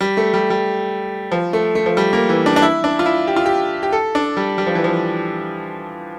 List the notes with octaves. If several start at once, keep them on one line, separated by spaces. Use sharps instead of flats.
G3
A3
G3
G3
F3
A3
A3
F3
G3
A#3
E3
D4
D4
E4
D4
F4
E4
G4
F4
G4
G4
A4
D4
G3
G3
F3
E3
F3